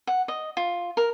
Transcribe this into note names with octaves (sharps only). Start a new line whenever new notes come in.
F#5
D#5
F4
A#4